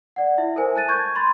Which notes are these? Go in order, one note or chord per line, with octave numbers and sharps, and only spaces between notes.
D5 F#5
E4 E5
A4 A#4 C5 G#5
A5 F#6 A6 D#7
C#6 G6 G#6
B5 C6 A6